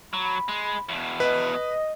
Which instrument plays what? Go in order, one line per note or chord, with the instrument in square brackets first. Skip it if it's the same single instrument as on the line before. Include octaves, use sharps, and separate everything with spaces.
[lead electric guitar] F#3 [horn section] B5
[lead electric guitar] G#3
E2 B2
[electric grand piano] B4 [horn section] D#5